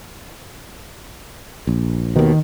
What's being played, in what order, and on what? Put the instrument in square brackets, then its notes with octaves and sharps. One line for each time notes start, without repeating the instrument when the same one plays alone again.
[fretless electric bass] A#1
[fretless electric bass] D#2 B2 [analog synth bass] D#3